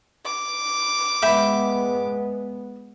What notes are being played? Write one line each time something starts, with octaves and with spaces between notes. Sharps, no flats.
D6
G#3 B3 E5 G5 B5